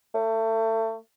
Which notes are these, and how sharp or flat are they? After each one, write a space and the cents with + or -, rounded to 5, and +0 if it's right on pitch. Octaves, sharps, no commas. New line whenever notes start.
A3 +30